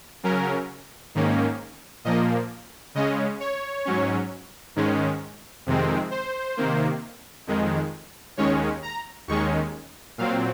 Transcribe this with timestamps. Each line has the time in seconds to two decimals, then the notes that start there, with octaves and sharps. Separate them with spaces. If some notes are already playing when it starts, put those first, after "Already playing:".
0.23 C#3 F#3 C#4 A#4
1.15 G#2 D#3 A#3 C#4
2.05 A#2 F3 A#3 D#5
2.95 C#3 G#3 C#4 D#5
3.40 C#5
3.85 G#2 F#3 C#4
4.76 G#2 D#3 G#3 C#4
5.66 F2 C3 D#3 G#3 C4
6.11 C5
6.57 C3 D#3 A#3
7.47 F2 D#3 G#3
8.37 D#2 D#3 G#3 C#4 C#5
8.83 A#5
9.28 D#2 D#3 G#3 C#4 C#6
10.18 A#2 F#3 C4 F5